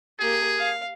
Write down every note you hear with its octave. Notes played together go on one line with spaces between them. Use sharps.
A#3 G4 G#4
F5